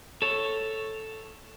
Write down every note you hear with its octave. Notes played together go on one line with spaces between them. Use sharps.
A4 C#5